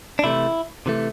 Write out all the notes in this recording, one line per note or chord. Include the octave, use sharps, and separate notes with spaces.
D4
C3 E3 A3 E4
C3 E3 A3